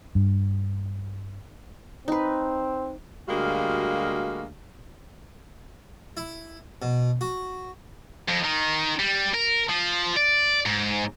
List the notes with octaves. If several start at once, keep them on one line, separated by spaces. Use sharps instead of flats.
G2
C4 D#4 B4
D2 G3 G#3 A#3 F#4 F5
E4
B2
F#4
F2
D#3
G3
A#4
F3
D5
G#2